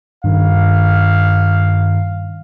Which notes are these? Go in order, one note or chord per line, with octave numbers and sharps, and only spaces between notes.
G2 D#3 F5